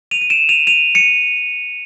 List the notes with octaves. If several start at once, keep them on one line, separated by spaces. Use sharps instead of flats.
D#7 F7
D#7
D7 E7
D#7 F7
D#7 F7
C#7 D#7